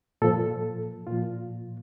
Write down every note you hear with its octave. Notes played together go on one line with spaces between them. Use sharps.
A#2 F3 A4
A#2 F3 F4